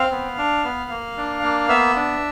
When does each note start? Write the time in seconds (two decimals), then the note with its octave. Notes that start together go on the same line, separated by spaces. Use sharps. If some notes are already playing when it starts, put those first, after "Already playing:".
Already playing: C4 F5
0.12 B3
0.38 D4
0.64 B3
0.90 A#3
1.17 D4
1.43 A#3
1.68 B3 E5
1.96 D4